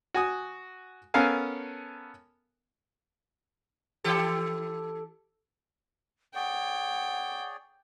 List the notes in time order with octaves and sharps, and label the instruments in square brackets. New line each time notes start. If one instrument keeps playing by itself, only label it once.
[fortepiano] F#4 G#5 D#6
B3 C#4 A4 A#4 F5 G#5
[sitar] E3 G4 A4
[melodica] G#4 C#5 D5 [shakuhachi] F#5 [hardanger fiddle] G5